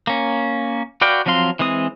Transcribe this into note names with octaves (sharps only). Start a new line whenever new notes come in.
A#3 C#4
F#4 B4 D5 F5 G5
F3 F#3 C4 F5 C6
E3 G#3 C4 D#6